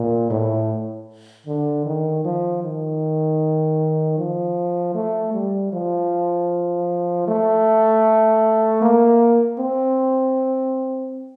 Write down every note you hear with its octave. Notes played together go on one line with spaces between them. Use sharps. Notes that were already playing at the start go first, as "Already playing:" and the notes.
Already playing: A#2
A2
D3
D#3
F3
D#3
F3
A3
G3
F3
A3
A#3
C4